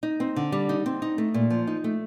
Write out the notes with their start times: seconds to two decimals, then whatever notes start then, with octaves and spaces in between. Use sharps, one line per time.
0.03 D#4
0.20 C4
0.36 D3
0.52 G3
0.69 D#4
0.86 C4
1.02 D#4
1.18 A3
1.34 A#2
1.50 F3
1.67 D#4
1.84 A3